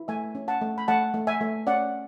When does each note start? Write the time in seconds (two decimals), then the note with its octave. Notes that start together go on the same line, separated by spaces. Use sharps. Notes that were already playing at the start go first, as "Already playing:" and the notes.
Already playing: E4
0.08 A3 E5 G#5
0.35 C#4
0.48 F#5 A5
0.61 A3
0.78 B5
0.88 A3 F#5 A5
1.14 A3
1.27 E5 G#5
1.41 A3
1.67 C#4 D5 F#5